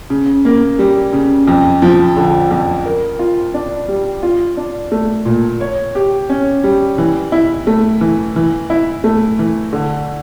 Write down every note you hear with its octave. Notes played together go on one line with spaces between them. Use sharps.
C#3
A#3
G3
C#3
F2
F3
D3
F2
A#4
F4
D4
G3
F4
D4
A3
A#2
C#5
G4
C#4
G3
E3
E4
A3
E3
E3
E4
A3
E3
D3